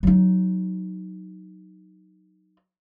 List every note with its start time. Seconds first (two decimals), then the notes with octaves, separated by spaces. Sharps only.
0.03 F#3 D#4